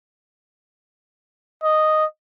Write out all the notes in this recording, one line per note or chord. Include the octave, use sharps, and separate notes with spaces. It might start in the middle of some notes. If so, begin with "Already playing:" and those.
D#5